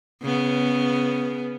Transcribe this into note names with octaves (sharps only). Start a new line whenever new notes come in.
C#3 B3